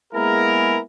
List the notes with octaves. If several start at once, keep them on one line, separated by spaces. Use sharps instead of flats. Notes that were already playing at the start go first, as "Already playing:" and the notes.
G#3 A#3 B3 E4 G#4 A#4